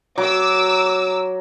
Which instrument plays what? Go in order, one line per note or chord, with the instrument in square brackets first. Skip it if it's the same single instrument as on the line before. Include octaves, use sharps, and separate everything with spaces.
[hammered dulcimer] F#3 [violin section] D6 E6